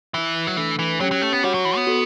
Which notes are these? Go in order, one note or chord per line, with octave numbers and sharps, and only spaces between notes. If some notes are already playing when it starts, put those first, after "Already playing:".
E3 E4 B4 E5
F#3
E3 A3 D4 A4
E3
F#3 C#4 G4 C#5 G5
F#3
A3
B3
G3 F#4 C#5 F#5
F#3
E3
B3
F#4 A4